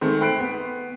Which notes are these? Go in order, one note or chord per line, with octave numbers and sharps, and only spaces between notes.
D#3 G#3 A3 C4
G5 B5 F#6 C7 D7
B3